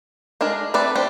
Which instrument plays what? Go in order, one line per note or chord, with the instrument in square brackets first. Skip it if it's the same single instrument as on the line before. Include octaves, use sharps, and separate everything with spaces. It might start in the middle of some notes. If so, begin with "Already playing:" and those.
[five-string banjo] G#3 D4 G#4 A#4
A3 C4 B4 D5
G3 C4 D4 G4